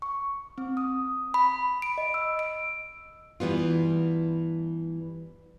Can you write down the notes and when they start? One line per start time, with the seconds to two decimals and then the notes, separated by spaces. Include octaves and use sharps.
0.02 C#6
0.58 C4
0.77 D#6
1.34 B5
1.82 D7
1.98 D#5
2.14 E6
2.39 D7
3.40 G2 E3 G3 B3 F4